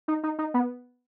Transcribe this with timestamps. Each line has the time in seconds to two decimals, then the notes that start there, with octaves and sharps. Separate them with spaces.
0.08 D#4
0.23 D#4
0.39 D#4
0.54 B3